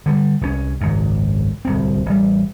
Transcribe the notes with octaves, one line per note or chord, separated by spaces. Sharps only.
D3 E3 G3
C2 G3 C#4
G#1 C#2 F#2
D1 C2 C4
A1 G3